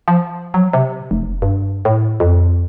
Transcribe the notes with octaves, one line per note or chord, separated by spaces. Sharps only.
F3
F#3
C3
F1
G2
A2
F2